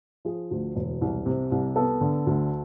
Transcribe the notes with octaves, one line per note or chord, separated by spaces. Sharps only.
F3 G#4
D2
E1
C2
C3
C2
B3 A4
D3
D2